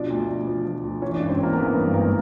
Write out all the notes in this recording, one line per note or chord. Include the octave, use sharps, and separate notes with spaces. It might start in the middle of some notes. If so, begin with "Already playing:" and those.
Already playing: B2 F3 D4 D5
D2
D2
F3
F3
D2
E3 C#4 C#5
G#1 D4 D5
C4 C5
E3 A#3 A#4
A#4
E3 B3 B4
G2
G#1 A#3 A#4